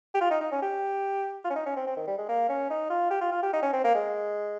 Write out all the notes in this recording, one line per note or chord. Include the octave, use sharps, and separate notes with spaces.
G4
F4
D#4
D#4
C#4
G4
F4
C#4
D#4
C#4
C4
C4
D#3
G3
G#3
A#3
C#4
D#4
F4
G4
F4
F4
G4
D#4
C#4
C4
A#3
G#3